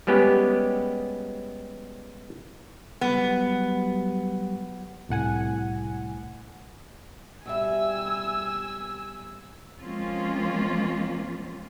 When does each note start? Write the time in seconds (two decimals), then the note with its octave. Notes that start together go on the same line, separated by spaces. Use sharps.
0.07 G3 G#3 B3 C#4 G4
3.01 F#3 G3 B3
5.09 C2 A2 F#5 G#5
7.46 B2 G3 E5 G#5 E6
9.80 F3 G#3 A#3 C4 C#4 F4